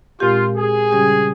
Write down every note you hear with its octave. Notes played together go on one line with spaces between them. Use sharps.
A#2 G#3 C4 F4 G4
G#4
C#3 G3 C#4 G4